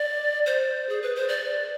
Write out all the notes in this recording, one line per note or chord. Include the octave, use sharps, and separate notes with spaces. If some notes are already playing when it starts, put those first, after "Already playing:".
Already playing: D5
C5
G#4
B4
C5
D5